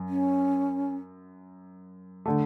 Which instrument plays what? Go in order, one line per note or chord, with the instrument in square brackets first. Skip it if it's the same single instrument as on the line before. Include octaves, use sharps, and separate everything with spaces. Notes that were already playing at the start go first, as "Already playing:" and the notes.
Already playing: [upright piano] F#2
[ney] C#4
[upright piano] D3 A3